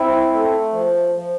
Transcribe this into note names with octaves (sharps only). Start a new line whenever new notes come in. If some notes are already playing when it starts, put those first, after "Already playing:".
Already playing: C4 E4
A3
F3
F3